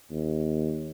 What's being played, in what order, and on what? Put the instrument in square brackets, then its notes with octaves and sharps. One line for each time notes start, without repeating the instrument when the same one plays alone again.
[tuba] D#2